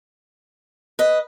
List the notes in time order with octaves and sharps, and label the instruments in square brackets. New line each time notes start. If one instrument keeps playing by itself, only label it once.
[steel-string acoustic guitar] B4 D#5